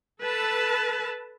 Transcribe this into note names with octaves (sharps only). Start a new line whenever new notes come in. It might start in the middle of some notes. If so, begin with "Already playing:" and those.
A4 B4 A5